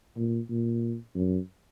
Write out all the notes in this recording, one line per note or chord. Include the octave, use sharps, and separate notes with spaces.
A#2
A#2
F#2